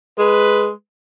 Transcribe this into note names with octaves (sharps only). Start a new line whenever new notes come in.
G#3 B4